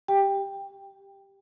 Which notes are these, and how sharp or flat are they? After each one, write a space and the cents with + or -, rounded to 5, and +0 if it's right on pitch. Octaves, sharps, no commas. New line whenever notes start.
G4 +0 G5 +10